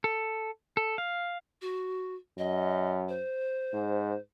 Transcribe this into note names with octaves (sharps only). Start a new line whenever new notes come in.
A4
A4
F5
F#4
F#2 D#5
C5
G#2